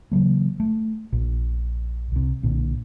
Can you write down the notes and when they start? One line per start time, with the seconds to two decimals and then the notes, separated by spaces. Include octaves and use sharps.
0.12 C#3 E3 F#3 A#3
0.60 A3
1.13 A#1
2.12 C2 C3
2.43 B1 A#2 D3